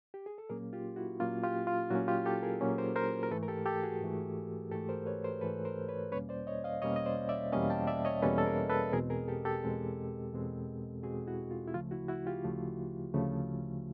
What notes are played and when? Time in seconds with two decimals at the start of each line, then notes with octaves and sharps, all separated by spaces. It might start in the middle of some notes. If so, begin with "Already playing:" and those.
0.14 G4
0.26 G#4
0.38 A4
0.49 A#2 F#3 A#3 C#4 G#4 A#4
0.73 F4 G4
0.96 E4 F#4
1.20 A#2 F#3 A#3 C#4 F4
1.44 F4 G4
1.67 F4
1.90 A#2 F#3 A#3 C#4 E4 F#4
2.08 F4 G4
2.25 G4 A4
2.43 G#4 A#4
2.61 A#2 F#3 A#3 C#4
2.78 A#4 C5
2.96 A#4 C5
3.23 A#4
3.31 G#2 E3 A3 A4 B4
3.43 A#4
3.48 G4 A4
3.66 G4 A4
3.84 F#4 G#4
4.01 G#2 E3 A3
4.71 G#2 E3 A3 G4 A4
4.89 A#4 C5
5.06 B4 C#5
5.24 A#4 C5
5.41 G#2 E3 A3 A4 B4
5.65 A#4 C5
5.88 B4 C#5
6.12 E2 B2 G3 A#3 C#4 B4 C#5
6.29 C5 D5
6.47 C#5 D#5
6.64 D#5 F5
6.82 E2 B2 G3 A#3 C#4 C#5 D#5
6.96 D#5
7.05 C5 D5
7.29 D5 E5
7.52 E2 B2 G3 A#3 C#4 D#5 F5
7.70 G5 A5
7.87 D5 E5
8.05 C#5 D#5
8.22 E2 B2 G3 A#3 C#4 A4 B4
8.38 A4
8.46 G#4 A#4
8.69 A4 B4
8.93 E2 B2 G#3 C4 G#4 A#4
9.10 G#4 A#4
9.28 G4 A4
9.45 G4 A4
9.63 E2 B2 G#3 C4
10.33 E2 B2 G#3 C4
11.03 E2 B2 G#3 C4 F#4 G#4
11.27 E4 F#4
11.51 F4
11.67 E4
11.73 D2 C#3 F3 A3 F4
11.91 E4 F#4
12.08 E4 F#4
12.26 F4 G4
12.44 D2 C#3 F3 A3
13.14 D2 C#3 F3 A3